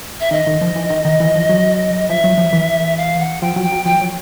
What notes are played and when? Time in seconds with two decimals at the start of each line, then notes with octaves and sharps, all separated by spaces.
0.20 E5
0.31 D#3 D#5
0.47 D#3
0.61 F3
0.76 E3
0.90 D#3
1.05 D#3
1.20 E3
1.35 F3
1.49 F#3
2.08 F3 E5
2.24 F#3
2.38 F3
2.53 E3
2.97 F5
3.19 F#5
3.42 F3 G5
3.56 F#3
3.64 G5
3.72 F#3
3.86 F3 G5
4.01 F#3